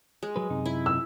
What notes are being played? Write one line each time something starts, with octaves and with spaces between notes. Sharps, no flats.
G#3
F#3 B4
F#2 C3 D#4
E4
E6